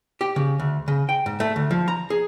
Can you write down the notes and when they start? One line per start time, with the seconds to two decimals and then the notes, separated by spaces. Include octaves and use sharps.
0.21 G4
0.36 C#3
0.60 D2
0.88 C#3
1.09 G5
1.26 G#2
1.40 A3
1.56 D2
1.71 F3
1.88 A#5
2.10 G#4